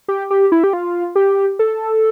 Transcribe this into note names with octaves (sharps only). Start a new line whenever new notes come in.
G4
G4
E4
G4
F4
G4
A4